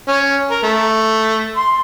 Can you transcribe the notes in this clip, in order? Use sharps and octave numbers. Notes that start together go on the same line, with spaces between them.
C#4
A#4
A3
C6